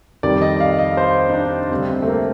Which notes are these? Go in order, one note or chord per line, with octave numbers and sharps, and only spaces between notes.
F2 D#3 G3 D5
D#5
F5
D#5
C5
D#4
D4
D2 C3 G3 C4
C4
A3
A#3